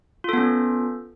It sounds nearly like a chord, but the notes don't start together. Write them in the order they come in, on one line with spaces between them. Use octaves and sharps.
F4 A4 B3 C#4